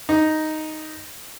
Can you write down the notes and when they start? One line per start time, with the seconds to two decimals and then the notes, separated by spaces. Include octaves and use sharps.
0.09 D#4